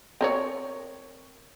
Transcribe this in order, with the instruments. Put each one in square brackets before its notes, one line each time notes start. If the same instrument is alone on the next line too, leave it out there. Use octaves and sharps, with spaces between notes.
[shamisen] C4 A#4 C#5